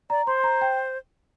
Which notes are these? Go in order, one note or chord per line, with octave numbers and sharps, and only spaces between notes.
D5 A#5
C5 C6
A#5
G5